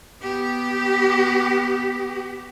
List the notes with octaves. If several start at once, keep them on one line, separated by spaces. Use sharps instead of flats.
B3 G4